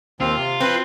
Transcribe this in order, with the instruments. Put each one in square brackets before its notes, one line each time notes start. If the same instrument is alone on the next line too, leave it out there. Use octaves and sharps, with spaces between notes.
[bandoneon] D#2 C4 [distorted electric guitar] F4
[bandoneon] C3
[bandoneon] F3 [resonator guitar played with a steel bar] C4 [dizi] B4